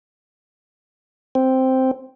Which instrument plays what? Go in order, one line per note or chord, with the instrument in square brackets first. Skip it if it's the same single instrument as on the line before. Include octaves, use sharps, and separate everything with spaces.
[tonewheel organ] C4